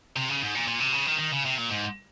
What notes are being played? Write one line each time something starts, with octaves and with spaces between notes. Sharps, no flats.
C3
C#3
G#2
A#2
A#2
C3
C#3
D#3
D#3
C#3
C3
A#2
G#2